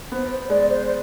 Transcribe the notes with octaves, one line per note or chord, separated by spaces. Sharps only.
B3 C5
C5
G#3 D5
C5